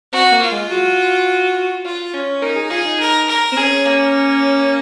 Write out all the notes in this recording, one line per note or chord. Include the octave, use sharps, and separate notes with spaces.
C4 F#4
A#3
F4
G#3
F#4
F4
C#4
D#4 A#4
G#4
F4 G#4
D#4
A#4
A#4
C4
C#4 G#4
A#3